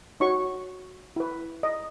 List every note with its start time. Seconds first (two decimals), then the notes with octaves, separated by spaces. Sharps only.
0.20 D#4 F#4 C#5 C#6
1.16 E4 B4
1.63 D#5